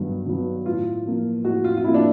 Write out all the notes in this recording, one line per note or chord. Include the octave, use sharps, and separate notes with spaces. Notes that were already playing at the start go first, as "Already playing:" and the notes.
Already playing: G2 D#3 F#3 B3
D#3 F#3 B3
A2 F4
F3 A#3
A2 F#4
F4
F4
F3 A#3 E4
D4